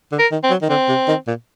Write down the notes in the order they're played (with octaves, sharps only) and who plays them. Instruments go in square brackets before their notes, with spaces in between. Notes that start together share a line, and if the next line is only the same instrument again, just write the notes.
[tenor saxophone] D3
[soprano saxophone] A#4
[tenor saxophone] D#3
[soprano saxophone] C4
[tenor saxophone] F#3
D#3
[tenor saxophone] D3 [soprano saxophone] C4
[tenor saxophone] C3
D#3
A#2